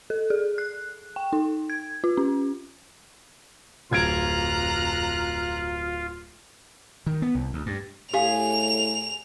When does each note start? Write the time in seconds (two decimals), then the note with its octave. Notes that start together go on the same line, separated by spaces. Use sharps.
0.10 A4
0.30 G#4
0.58 F#6
1.16 G5
1.33 D#4
1.70 G#6
2.04 F4
2.17 C#4
3.91 D1 F2 F4 A#5 F#6 G#6 D7
7.06 D#3
7.22 B3
7.35 C2
7.53 D2
7.66 G2
8.14 A2 G4 G#4 F5 F7